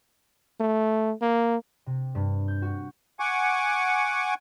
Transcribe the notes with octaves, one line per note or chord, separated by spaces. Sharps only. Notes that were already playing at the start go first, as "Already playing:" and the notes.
A3
A#3
C3
G2
G6
F#4
F#5 G#5 C#6 D6